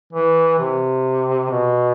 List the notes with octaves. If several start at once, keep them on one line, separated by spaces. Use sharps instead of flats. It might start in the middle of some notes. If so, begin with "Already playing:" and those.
E3
C3
B2